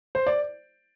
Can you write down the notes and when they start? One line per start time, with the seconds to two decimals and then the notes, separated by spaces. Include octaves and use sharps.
0.15 C5
0.27 D5